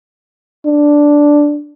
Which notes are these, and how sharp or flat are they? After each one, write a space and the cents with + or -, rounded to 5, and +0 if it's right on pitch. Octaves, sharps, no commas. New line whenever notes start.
D4 -5